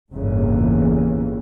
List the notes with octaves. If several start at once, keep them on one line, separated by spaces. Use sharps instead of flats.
G1 E2 A2 C#3 E3 A#3